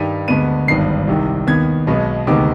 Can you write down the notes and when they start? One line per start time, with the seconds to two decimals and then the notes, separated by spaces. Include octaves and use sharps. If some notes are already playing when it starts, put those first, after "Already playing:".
Already playing: G2 D#3 G3 D#7
0.28 D2 D3 G#3 B3 D#7
0.68 G#1 G2 D#3 B3 C7
1.08 C2 C3 D#3
1.47 D#2 D#3 B3 G#6
1.87 B1 B2 G#3 B3
2.27 D2 C3 D#3 G#3 B3 D6